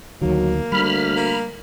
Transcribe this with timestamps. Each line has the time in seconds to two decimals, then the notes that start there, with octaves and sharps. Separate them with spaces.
0.22 D2 D#3 F#3 A#3
0.72 D2 G3 B5 F6
1.15 A#3